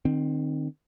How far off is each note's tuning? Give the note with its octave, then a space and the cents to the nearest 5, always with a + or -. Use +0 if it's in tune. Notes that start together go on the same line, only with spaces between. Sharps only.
D#3 -35 C4 +0